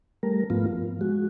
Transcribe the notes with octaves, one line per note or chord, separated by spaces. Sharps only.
G3 A3 A#4
G#2 F3 A3 B3 F4
F3
G#3 F#4